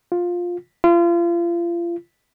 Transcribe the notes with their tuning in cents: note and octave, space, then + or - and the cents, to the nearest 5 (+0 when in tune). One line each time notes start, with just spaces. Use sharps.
F4 +10
F4 -35